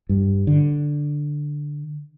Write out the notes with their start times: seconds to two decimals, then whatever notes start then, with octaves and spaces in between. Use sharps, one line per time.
0.09 G2
0.47 D3